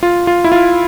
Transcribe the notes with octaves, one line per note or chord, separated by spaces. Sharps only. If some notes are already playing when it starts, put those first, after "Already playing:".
F4
F4
E4
F4